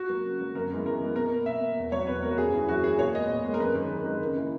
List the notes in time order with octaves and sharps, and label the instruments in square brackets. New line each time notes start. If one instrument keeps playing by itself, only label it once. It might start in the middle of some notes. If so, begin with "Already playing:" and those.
Already playing: [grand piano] F#4
F#3 A#3
C#3
F#3 A#3
F#2 A#4
E3 G#3 B3
F#2 A#4
E3 G#3 B3
B2 A#4
A#3
B2 E5
A#3
E2
B2 F#3 C#5
E2 B4
B2 F#3 A#4
F#4
F#2 G#4
E3 A#3
F#2 F#4
E3 A#3 G#4
A#2 C#5
G#3 B3 D#5
A#2
G#3 B3
A#4
F#2 B4
D#3 G#3
F#2
D#3 G#3
C#3
E3 A#3